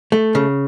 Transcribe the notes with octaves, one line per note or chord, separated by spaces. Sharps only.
A3
C#3